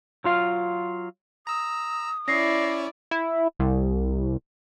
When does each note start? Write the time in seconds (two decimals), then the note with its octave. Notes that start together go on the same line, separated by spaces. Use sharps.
0.24 F#3 F4 F5
1.47 A#5 D#6 E6
2.28 C#4 E4 C#5 D5 A#6 C7
3.11 E4
3.59 C2